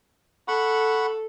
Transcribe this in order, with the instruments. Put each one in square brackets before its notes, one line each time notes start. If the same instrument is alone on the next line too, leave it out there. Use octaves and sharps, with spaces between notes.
[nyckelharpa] A4 [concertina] F#5 B5 C#6